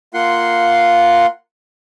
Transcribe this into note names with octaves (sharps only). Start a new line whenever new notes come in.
A#3 F4 F#5 C6